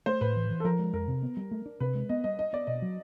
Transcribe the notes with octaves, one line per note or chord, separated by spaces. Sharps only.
A3 C5
A2 B4
E3
E3
A4
F3 A#4
G#3
F2 A#4
C3
B3
G3
A3
D4
C3 B4
G#3
B3 D#5
G3 D#5
D4 D#5
B3 D5
B2 D#5
F#3